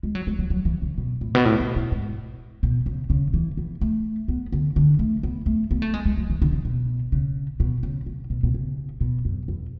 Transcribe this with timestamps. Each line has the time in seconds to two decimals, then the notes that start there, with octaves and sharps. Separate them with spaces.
0.03 G#3
0.15 F#3
0.27 G#3
0.39 F#3
0.50 F#3
0.65 E3
0.82 C#3
0.98 B2
1.21 A2
1.35 B2
1.45 A2
1.60 B2
1.76 B2
1.92 G#2
2.63 B2
2.86 C#3
3.10 C#3
3.34 E3
3.57 B3
3.81 A3
4.28 B3
4.52 D3
4.76 D3
4.99 A3
5.23 B3
5.46 A3
5.71 B3
5.82 A3
5.94 G#3
6.06 G#3
6.17 F#3
6.30 E3
6.42 D3
6.52 C#3
6.65 B2
7.12 C#3
7.60 B2
7.83 C#3
8.06 C#3
8.30 B2
8.43 B2
8.54 C#3
9.01 B2
9.25 F#2
9.48 E2